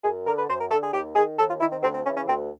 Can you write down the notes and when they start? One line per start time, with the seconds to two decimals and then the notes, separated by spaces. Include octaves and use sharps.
0.04 F#2 G#4
0.26 D3 A#4
0.38 B4
0.49 F#2 C5
0.61 A#4
0.71 D3 A4
0.83 G#4
0.93 D#2 G4
1.15 D#3 G#4
1.38 D#2 A4
1.50 F4
1.61 D#3 E4
1.72 C4
1.83 D2 C4
1.94 C4
2.05 C#3 C#4
2.09 E3
2.16 C#4
2.27 D2 C4